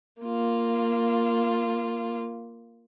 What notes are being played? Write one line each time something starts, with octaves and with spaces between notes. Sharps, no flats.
A#3 F4